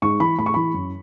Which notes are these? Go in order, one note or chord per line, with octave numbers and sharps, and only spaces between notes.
G#2 C#6
E3 B5
A2 B5
C#6
E3 B5
F#2